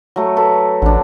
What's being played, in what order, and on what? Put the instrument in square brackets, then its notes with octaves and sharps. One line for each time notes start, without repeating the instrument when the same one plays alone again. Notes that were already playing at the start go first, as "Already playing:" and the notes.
[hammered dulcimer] F#3 A3
A4 B4
[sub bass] A1 [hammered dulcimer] D3 D4